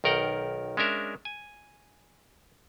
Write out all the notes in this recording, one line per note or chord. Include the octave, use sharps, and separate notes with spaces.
B1 D#3 A#4 F#5 G5
G#3 C#4 D4 A#4 E5
G#5